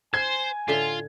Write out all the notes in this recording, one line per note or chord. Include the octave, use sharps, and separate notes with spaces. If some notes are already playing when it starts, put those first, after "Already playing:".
C5 G#5 G#6
A2 D3 F4 E5